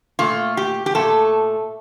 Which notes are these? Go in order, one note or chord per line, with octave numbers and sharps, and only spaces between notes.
A#2 A3 F4
G4
G4
A#2 A3 A4